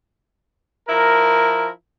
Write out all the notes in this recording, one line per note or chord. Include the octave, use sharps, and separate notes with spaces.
F3 E4 A#4